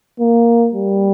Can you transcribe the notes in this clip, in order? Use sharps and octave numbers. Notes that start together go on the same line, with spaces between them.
A#3
G3